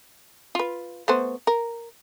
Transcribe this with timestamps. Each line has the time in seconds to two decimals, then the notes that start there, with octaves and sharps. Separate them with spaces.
0.55 F4 B4
1.08 A3 B3 C5
1.47 A#4